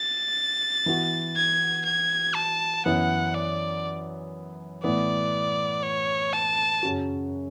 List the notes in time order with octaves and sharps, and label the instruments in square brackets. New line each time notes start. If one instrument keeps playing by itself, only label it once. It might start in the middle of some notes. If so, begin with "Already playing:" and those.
Already playing: [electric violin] A6
[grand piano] E3 B3 F#4
[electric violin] G#6
G#6
A5
[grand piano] F#2 E3 B3 [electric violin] F#5
[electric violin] D5
[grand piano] A2 E3 B3 [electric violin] D5
[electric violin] C#5
A5
[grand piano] F#2 C#3 F#3 C#4 F#4